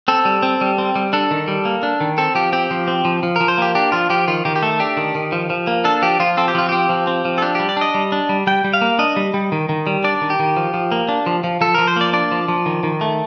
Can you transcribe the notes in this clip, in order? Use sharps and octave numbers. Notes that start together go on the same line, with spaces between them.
C4 A4
G3
C4
G3
C4
G3
D4 A4
D#3
G3
A#3
D4
D#3
C4 A4
F3 G4
C4 G4
F3
C4
F3
F3
F3 A#4
C5
A#3 G4
D4 G4
F3 F4
F3 G4
D#3 F4
D#3 G4
G4
A3 A4
D4 G4
D#3
D#3
F3
F3
A#3
D4 A4
F3 G4
F3 F4
C4 A4
G4
F3 F4
C4 G4
F3
C4
F3
A4
D4 G4
G3 G4
D5
D4 D#5
G3
D4
G3
G3 G5
G3
F5
A#3
D4 D#5
G3
G3
D#3
D#3
G3
D4 D5
D#3
G4
D#3
F3
F3
A#3
D4
F3
F3
F3 A4
F3 A#4
C5
A#3 D5
D4 D5
F3
F3
D#3
D#3
A3